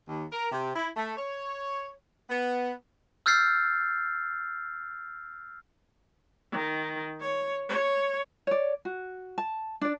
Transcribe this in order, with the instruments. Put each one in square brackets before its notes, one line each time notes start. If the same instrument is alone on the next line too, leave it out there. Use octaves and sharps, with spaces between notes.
[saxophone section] D#2
A#4
C3
E4
A3
C#5
B3
[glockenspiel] E6 F6 G6 A6 C7
[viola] D#3
C#5
C#5
[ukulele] C#5 D5
F#4
A5
D4 D5